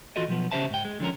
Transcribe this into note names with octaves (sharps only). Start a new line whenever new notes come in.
E3 F4 F#4 A4 D#5
B1 F3 B3
C#3 C#4 G4 C5 E5 A5
G#2 G5
G#3
D3 F3 C#4 A#4